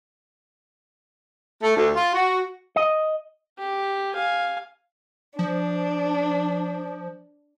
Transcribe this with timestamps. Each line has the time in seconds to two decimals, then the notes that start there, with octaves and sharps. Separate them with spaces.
1.62 A3
1.76 D2
1.94 F4
2.13 F#4
2.76 D#5
3.59 G4
4.14 F5 G#5
5.39 F3 D4